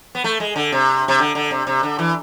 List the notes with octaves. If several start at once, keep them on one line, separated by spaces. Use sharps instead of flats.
B3
A3
G#3
D3
C3
C3
D3
D3
C3
C3
D3
E3